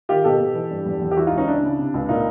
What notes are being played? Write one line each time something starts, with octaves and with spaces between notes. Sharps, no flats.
D#3 F4 G4
B2 G4 A4
B2
E3
G2
E2
E2
G4
E3 E4 F#4
D#4 F4
C#2
C#4 D#4
C#3 D4 E4
C#3
C3
C#2
A#2 D#4 F4